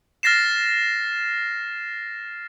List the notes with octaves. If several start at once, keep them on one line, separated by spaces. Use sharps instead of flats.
F6 A6 A#6 C7 E7